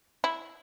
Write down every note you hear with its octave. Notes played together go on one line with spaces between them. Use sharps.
E4